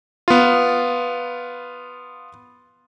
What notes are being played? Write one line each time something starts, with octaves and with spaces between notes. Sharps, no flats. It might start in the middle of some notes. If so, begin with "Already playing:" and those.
B3 F4